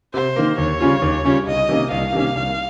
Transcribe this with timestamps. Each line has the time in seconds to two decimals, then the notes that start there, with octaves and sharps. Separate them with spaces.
0.14 C3 C5
0.36 D#3 A#3
0.58 D#2 C#5
0.81 C#3 G3 C#4 F4
1.02 D#2
1.25 C#3 G3 C#4 F4
1.47 C2 D#5
1.69 C3 D#3 A#3 C#4
1.91 C2 F5
2.13 C3 D#3 A#3 C#4
2.35 C2